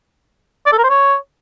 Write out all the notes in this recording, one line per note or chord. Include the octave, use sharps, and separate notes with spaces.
D5
A4
A#4
C5
C#5